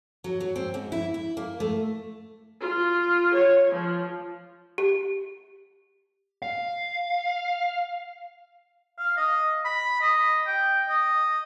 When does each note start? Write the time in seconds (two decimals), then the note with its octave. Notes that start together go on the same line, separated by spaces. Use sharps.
0.24 F#3
0.40 F#3
0.56 C4
0.74 G#2
0.92 E4
1.14 E4
1.37 A#3
1.60 A3
2.62 F4
3.34 C#5
3.72 F3
4.78 G4
6.42 F5
8.99 F5
9.17 D#5
9.65 B5
10.01 D#5
10.47 G5
10.89 D#5